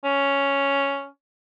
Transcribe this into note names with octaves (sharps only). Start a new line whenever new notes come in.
C#4